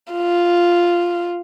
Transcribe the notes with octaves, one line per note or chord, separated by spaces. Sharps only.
F4